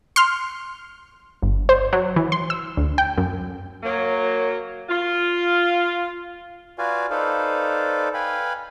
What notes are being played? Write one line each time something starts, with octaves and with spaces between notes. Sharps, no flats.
C6 F6
G1
C5
F#3
E3
C6
E6
D2
G5
F#2
F#3 A#3
F4
F4 F#4 B4 D5 F5 G#5
D#4 A4 B4 C5 D5 F5
B4 F5 G5 G#5 B5